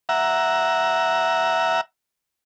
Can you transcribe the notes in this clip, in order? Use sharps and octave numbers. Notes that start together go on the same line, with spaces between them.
E5 F#5 A#5